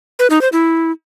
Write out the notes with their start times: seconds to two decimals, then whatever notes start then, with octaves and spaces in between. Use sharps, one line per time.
0.19 B4
0.30 D#4
0.41 C5
0.52 E4